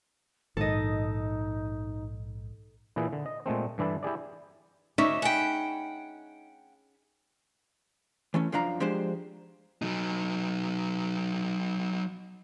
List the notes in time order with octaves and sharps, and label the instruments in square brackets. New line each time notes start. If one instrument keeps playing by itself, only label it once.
[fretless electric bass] A#1 D#3 [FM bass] G#2 [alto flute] D#4 [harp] A4 D#5
[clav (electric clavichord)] A#2 E3 E4 G#4
D3
D#5
A#2 G#3 A3 C4
G2 E3 D4 E4 A4 A5
E4 G4 G#4 D5
[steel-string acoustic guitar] D2 [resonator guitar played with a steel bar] C#4 E5 [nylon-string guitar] D#4 [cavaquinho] D5 C#6 D6
[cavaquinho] G#4 B5 [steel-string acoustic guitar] F#5 G5
[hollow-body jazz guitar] E3 A3 C#4
F#2 F3 D4 F5 A#5
F3 G#3 D4 G4 C5
[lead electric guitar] F#3 D#4